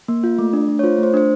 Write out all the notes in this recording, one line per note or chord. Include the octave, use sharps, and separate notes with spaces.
A#3
F4
A3
D4
A3
C#5
F4 C5
A3 C5
D4 C5